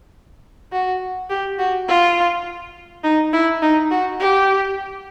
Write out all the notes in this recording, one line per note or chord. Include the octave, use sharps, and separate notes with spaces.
F#4
G4
F#4
F4
D#4
E4
D#4
F#4
G4